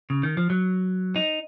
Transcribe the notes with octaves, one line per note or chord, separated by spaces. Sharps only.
C#3
D#3
F3
F#3
D#4